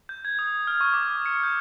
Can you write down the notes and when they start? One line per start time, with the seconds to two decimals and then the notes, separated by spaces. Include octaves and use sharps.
0.09 G6
0.25 G#6
0.39 D#6
0.67 F6
0.81 C#6
0.94 D6
1.26 C#7
1.43 G6